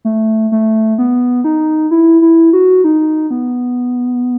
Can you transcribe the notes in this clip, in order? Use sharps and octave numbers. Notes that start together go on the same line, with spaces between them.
A3
A3
B3
D#4
E4
E4
F#4
D#4
B3